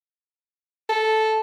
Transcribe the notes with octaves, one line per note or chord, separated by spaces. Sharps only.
A4